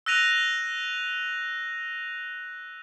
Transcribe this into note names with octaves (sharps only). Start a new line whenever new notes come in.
E6 F#6 A#6 D#7 F7